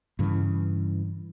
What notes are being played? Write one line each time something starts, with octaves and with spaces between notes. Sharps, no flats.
G2 C#3 E3